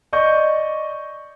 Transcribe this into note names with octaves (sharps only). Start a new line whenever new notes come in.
D5 D#5 C#6 G6